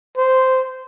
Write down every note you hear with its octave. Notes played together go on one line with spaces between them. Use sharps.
C5